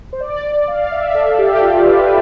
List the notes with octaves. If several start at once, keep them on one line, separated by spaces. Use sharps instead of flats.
C5
D5
F5
E5
A4
G4
F4
B4